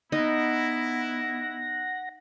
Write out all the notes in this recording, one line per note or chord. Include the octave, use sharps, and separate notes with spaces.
B3 D#4 E4 F#5 A#6